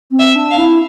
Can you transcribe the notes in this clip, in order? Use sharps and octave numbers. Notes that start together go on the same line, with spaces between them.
C4
E5
D4
F5
E4